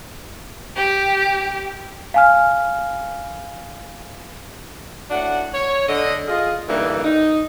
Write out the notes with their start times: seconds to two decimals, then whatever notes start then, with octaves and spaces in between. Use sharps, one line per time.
0.76 G4
2.14 F5 G#5 F6
5.10 A2 D4 F#4 F#5
5.54 C#5
5.89 D3 D#5
6.27 F4 G#4 A#4 D#5
6.69 G2 D3 E3 A#3 D#4
7.04 D#4